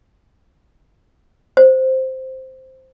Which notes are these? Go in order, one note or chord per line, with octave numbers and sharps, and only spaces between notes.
C5